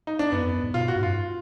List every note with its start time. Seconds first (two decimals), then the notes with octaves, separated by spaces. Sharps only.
0.07 D#4
0.19 D4
0.32 F#2 B3
0.42 F2
0.52 F#2
0.64 G#2
0.74 B2 F4
0.85 A#2
0.88 F#4
0.96 G#2
1.03 F#2 F4